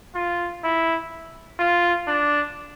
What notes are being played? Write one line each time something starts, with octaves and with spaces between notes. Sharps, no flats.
F4
E4
F4
D4